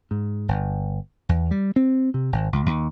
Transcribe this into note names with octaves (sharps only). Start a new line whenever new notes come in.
G#2
G1
E2
G3
C4
C3
G#1
C#2
D#2